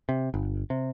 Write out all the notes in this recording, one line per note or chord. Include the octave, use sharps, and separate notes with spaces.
C3
G1
C3